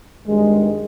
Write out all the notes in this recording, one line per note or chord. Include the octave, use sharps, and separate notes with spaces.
G#1 G2 D#3 G#3